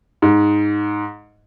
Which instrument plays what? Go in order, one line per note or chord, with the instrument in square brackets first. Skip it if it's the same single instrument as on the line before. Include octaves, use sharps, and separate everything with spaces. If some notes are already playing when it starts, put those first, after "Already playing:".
[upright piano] G#2